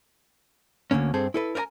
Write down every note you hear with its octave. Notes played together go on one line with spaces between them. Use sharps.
D2 G#2 D3 A#3 C#4
G2 C4 G#4 A4
E4 A4 B4
A#4 B4 D5 G#5 A#5